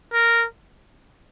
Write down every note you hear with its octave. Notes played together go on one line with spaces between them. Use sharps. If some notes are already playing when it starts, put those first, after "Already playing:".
A#4